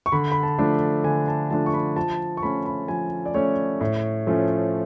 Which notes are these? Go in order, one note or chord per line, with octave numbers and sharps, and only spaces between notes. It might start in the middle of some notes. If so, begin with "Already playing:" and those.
C#6
D3 B5
B5
A5
F3 A3 D4
D3 G#5
A5
F3 A3 D4 A5
C#6
B5
F3 A5
C#6
A3 C#4 B5
B5
F3 G#5
D5
A3 C#4 C#5
A2
F3 A3 C#4